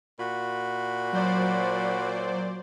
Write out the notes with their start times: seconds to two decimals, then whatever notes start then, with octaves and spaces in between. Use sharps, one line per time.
0.19 A#2 F#4 B5
1.13 F#3 C5 D5